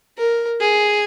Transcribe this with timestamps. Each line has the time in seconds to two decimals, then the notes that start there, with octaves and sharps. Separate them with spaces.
0.18 A#4
0.60 G#4